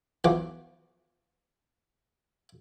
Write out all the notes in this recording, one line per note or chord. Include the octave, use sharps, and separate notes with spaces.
E2 E3 F3 F#4 D6